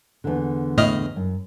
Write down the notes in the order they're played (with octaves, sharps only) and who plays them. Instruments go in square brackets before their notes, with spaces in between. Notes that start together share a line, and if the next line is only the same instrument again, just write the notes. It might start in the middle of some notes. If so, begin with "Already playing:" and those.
[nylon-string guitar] E2 D3
[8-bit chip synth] A2 D#5 F6
[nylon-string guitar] F#2